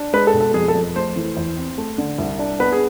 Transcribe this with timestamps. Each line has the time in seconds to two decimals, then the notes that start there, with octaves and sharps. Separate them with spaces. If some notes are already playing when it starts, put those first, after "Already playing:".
Already playing: D4
0.13 G#3 B4
0.27 A4
0.34 B2
0.41 A4
0.54 F2 G#4
0.68 A4
0.75 F2
0.96 A3 C5
1.16 E3
1.37 E2
1.57 C4
1.78 A3
1.98 D3
2.18 C2
2.39 D4
2.60 B3 B4
2.72 G#4